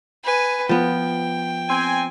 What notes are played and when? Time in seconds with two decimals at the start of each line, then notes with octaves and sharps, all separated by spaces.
0.24 B4 G#5
0.69 F3 B3 G5
1.69 C4 G#5